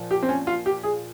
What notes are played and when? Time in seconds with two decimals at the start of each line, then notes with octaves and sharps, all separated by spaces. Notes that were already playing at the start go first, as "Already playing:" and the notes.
Already playing: A#2 F3
0.11 G4
0.23 C4
0.29 C#4
0.47 F4
0.66 G4
0.83 G#4